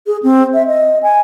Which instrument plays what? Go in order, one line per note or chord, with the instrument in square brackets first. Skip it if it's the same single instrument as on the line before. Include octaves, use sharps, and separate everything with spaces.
[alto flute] G#4
C4
E5
D#5
G#5